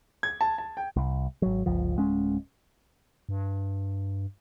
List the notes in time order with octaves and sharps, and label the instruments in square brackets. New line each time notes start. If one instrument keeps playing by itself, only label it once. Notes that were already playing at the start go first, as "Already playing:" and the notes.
[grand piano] G#6
A5
A5
G5
[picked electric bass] C2
G#1 F#3
G1 C#2 F3
D1 G#3 C#4
[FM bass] G2